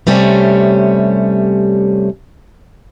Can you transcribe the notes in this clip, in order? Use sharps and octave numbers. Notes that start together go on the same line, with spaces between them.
C3 G3 A3 C#4